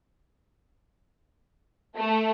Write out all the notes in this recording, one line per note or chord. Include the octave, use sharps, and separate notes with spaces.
A3